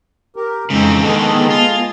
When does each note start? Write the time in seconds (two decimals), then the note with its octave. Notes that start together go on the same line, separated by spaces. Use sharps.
0.36 G4 A#4
0.70 F2 C#3 E3 F3 G#3 C4 D#4
1.04 D3 D#3 B3 G#4 A4 D#5 A5
1.50 F4